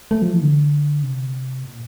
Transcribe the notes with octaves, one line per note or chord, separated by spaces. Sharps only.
A3
F3
E3
D3
C3
A#2